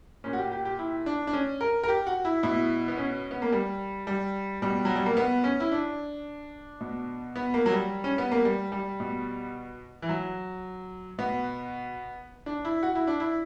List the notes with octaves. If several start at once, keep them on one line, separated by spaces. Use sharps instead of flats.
A#2 C#4
F#4
G4
G4
G4
E4
D4
D4
C#4
A#4
A#4
G4
F#4
E4
B2 E4
B3
C#4
B3
A#3
G3
G3
B2 G3
F#3
G3
A#3
B3
C#4
E4
D4
B2
B3
A#3
F#3
G3
C#4
B3
A#3
G3
G3
B2
E3
F#3
B2 B3
D4
E4
F#4
E4
D4
E4